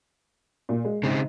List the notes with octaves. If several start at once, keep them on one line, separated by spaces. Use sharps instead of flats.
A#2
G#3
G#2 C#3 C4